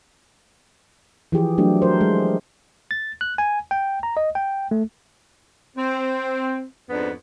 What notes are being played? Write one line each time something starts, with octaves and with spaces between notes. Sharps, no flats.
E3 F3 G4 G#4
F#3 A3 D4 G4
A#4 C5
G#3
A6
F#6
G#5
G5
A#5
D#5
G5
A3
C4
F2 G#2 B3 D4